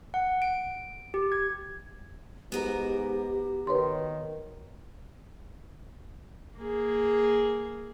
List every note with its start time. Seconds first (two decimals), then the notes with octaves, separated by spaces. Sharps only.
0.14 F#5
0.42 D7
1.14 G4
1.32 G#6
2.52 G#2 B3 F#4 G4 A#4
3.67 D#3 B4 C#5 C6
6.58 A#3 G#4